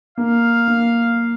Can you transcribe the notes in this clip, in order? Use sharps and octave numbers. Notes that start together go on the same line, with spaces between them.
A#3 F5
A#3